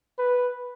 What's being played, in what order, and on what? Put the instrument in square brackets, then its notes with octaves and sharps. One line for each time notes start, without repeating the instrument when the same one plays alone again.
[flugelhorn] B4